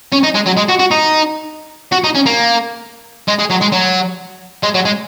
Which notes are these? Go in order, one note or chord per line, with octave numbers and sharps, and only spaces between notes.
C#4
D#4
G#3
F#3
G#3
F#4
F#4
D#4
F#4
D#4
C#4
A#3
G#3
G#3
F#3
G#3
F#3
G#3
F#3
G#3